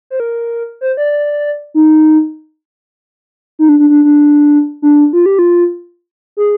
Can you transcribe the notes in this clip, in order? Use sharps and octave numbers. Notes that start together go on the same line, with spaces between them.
C5
A#4
C5
D5
D#4
D#4
D4
D4
D4
D4
D4
F4
G4
F4
G#4